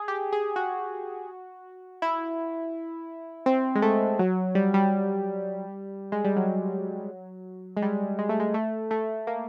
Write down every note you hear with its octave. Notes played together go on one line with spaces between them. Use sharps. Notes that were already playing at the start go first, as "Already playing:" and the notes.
Already playing: G#4
G4
G#4
F#4
E4
C4
G#3
A3
F#3
G3
G3
G#3
G3
F#3
G#3
G3
G#3
A3
G#3
A3
A3
A#3